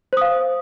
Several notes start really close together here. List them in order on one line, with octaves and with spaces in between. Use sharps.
C5 D#6 F5